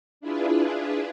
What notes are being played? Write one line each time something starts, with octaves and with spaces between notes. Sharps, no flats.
D4 E4 F4 G#4 B4